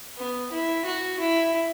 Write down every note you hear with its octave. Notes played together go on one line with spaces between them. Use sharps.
B3
E4
F#4
E4